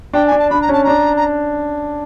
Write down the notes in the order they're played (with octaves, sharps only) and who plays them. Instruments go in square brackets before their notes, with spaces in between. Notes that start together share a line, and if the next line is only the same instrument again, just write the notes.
[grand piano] D4 [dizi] G5
[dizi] G#5
[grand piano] D4
[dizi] A5
[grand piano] D4 [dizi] B5
[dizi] A#5
[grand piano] C#4 [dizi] A5
[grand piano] D4 [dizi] A#5
[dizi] A#5